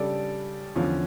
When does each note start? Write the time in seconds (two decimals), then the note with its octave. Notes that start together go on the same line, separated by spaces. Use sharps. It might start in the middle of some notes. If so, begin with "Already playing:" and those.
Already playing: C#3 G3 D4 A4 D5
0.75 E2 D3 F3 C#4